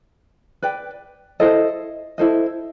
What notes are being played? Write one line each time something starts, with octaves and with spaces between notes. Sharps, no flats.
B4 D5 G5
E4 A4 C5 D#5
E4 A4 C5 D#5